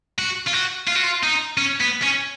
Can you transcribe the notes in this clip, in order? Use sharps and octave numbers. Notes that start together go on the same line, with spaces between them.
F#4
F4
F#4
F4
F#4
F4
D#4
C#4
B3
C#4